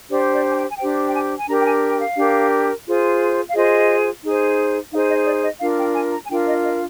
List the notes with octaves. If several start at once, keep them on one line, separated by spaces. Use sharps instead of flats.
D4 G4 C5 D5
D5
G#5
G5
G#5
D4 G4 C5 G5
G5
G#5
G#5
D4 G4 A#4 A#5
G5
G#5
G5
F5
D4 G4 A#4
F4 G#4 C5
F5
F4 G#4 C5 D#5
D#4 G#4 C5
D#4 G#4 C5 F5
D#5
D5
D#5
D4 F4 A#4 F5
G5
G#5
A#5
G#5
D4 F4 A#4 G5
D#5
D#5